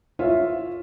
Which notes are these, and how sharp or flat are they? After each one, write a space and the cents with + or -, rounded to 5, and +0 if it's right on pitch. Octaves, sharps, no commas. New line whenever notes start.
F4 +0 C#5 +0 E5 +0